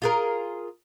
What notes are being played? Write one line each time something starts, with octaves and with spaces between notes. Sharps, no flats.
F4 G#4 A#4